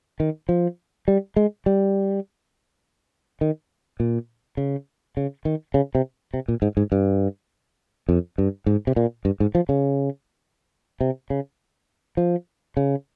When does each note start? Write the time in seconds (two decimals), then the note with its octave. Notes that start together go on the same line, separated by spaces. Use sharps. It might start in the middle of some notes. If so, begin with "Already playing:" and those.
0.20 D#3
0.49 F3
1.08 G3
1.36 G#3
1.66 G3
3.41 D#3
4.00 A#2
4.57 C#3
5.17 C#3
5.45 D#3
5.74 C#3
5.95 C3
6.34 C3
6.48 A#2
6.62 G#2
6.77 G#2
6.92 G2
8.09 F2
8.38 G2
8.66 G#2
8.87 C3
8.96 A#2
9.25 G2
9.40 G#2
9.55 F3
9.69 C#3
11.01 C3
11.30 C#3
12.17 F3
12.77 C#3